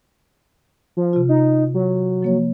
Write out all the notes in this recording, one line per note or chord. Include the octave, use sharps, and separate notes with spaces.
F3
C3 F4
D#4
F#3
F3 A#3 C#5